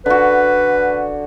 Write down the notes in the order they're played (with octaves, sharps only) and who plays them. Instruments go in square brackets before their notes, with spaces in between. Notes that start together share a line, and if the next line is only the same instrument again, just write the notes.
[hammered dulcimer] D3 F#4 [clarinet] B4